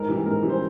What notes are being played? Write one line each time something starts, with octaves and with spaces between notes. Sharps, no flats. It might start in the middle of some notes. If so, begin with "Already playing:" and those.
Already playing: G#2 A#4
E3 G3
G#2 A#4
E3 G3
C5